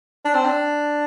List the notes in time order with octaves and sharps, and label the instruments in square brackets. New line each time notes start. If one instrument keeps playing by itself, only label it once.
[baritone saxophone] D4
C4
D4